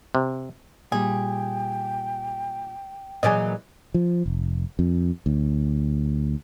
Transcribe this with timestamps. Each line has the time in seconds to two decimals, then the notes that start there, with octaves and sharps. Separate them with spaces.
0.15 C3
0.92 A#2 G3 G#4 G5
3.23 A#2 E3 F#3 G#4 D5 D#5
3.94 F3
4.26 F1
4.79 F2
5.26 D2